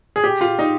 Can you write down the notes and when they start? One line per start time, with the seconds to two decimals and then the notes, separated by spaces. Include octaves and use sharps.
0.16 G#4
0.24 G4
0.41 F4
0.59 D#4